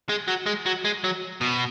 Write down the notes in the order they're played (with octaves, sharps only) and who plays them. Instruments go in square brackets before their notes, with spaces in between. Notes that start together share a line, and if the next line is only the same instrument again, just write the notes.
[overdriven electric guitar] G#3
F#3
G#3
F#3
G#3
F#3
B2